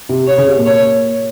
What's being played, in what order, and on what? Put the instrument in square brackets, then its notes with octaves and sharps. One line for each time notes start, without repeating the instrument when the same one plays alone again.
[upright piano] C3
[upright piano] C3 [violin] C#5
[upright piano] C#3
C3
A#2
[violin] C#5